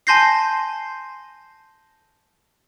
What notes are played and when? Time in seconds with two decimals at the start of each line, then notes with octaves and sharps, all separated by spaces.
0.07 G#5 A5 C6 G6 A#6 C7